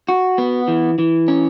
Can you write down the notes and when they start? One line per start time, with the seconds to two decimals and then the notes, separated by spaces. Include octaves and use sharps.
0.09 F#4
0.38 B3
0.68 E3
0.98 E3
1.28 C#4